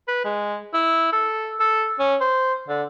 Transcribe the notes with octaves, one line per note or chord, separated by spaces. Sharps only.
B4
G#3
E4
A4
A4
C#4
C5
D3